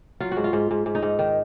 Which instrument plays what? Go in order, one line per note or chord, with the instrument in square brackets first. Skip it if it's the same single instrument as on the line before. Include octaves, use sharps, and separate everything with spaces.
[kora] F#3 F4
F#4
G#2
F4
G#2
G#2
G#2
D#4
G#2
D#3